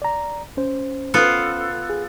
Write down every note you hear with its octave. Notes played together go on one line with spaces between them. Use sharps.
D5 A#5
C#4 C5
B3 F4 A4
G#4